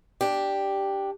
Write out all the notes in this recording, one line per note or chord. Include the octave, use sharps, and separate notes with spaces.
D4 G4